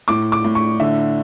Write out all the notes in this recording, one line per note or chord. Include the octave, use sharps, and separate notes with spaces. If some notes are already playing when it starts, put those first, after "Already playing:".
A2 D6
D6
A2
C#6
D3 E5